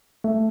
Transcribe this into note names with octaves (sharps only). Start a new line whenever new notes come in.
A3